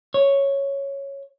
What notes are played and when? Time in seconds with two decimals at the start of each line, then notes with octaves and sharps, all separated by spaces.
0.14 C#5